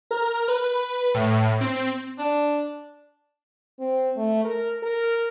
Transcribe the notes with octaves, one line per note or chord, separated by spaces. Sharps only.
A#4
B4
A2
C4
D4
C4
A3
A#4
A#4